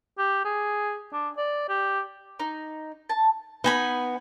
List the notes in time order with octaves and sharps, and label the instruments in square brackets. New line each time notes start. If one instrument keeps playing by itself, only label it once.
[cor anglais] G4
G#4
D4
D5
G4
[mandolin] D#4
A5
[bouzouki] B3 [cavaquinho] D#4 G#5 B5